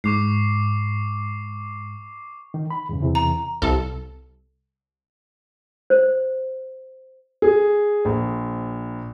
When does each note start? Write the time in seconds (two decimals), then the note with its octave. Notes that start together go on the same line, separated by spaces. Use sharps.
0.04 G#2 C#6 D6 C7
2.54 D#3
2.70 B5
2.89 E2 G2 C#3
3.02 E2 C3 E3
3.15 A#5
3.62 C2 A4
5.90 C5
7.42 G#4
8.05 A#1